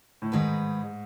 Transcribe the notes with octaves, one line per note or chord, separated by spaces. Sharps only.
A2
G#2 D#3 G#3 D#4 G#4 B4